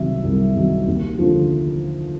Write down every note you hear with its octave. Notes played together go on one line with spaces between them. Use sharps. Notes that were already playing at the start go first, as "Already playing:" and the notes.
Already playing: C2 C3 D#3 F#3 E5
C2
C3 D#3 F#3
D#2
D3 F3